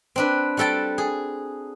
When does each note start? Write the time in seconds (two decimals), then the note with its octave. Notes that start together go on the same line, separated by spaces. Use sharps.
0.16 C4 D4 B4
0.57 G3 F#4 A4 G5 A5
0.98 G#4